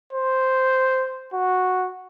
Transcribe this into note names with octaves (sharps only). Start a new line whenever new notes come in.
C5
F#4